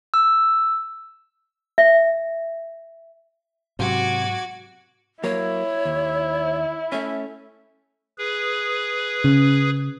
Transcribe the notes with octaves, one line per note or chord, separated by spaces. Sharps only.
E6
E5
G#2 C3 F#3 F#4 D6 G#6
F#3 A#3 E4 C#5
D#2
A3 C#4 E5
G#4 B4
C#3